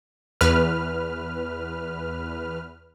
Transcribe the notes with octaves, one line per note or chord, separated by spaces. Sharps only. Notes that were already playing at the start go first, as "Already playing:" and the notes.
E2 B4 F6